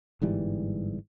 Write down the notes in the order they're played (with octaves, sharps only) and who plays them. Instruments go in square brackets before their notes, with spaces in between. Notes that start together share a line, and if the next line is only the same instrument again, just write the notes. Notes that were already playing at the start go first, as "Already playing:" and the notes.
[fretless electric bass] G1 G#2 E3 G3